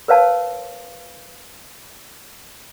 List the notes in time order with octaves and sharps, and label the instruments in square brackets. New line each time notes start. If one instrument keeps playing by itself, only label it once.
[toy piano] A#4 B4 C#5 F5 A5